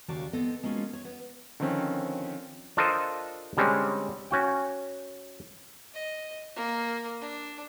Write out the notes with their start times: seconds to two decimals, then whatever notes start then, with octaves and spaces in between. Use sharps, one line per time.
0.08 D#2 C#3 A#3 F#4 D5 A5
0.33 B3 C4 A4 D#5
0.63 G#3 A#3 C#4 F4 F#4 A4
0.93 C#5
1.05 B3
1.60 D3 D#3 F3 C4 C#4
2.77 D4 F4 A4 A#4 C5 D#5
3.57 D3 G3 G#3 C4 C#4
4.31 C#4 F#4 G5
5.94 D#5
6.56 A#3
7.21 D4